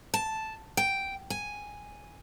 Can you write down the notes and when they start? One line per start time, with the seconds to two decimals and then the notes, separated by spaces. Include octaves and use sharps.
0.14 A5
0.77 G5
1.30 G#5